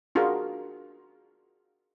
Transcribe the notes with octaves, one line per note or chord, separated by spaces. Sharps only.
D4 F4 F#4 G#4 A#4